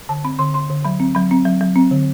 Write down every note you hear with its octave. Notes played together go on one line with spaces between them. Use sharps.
D3 A5
C4 B5
D3 C6
D3 C6
D3
F#3 B5
C4
F#3 B5
C4
F#3
F#3
C4
D3